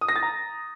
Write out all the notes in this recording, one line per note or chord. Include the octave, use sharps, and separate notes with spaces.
D#6
A#6
A6
A#5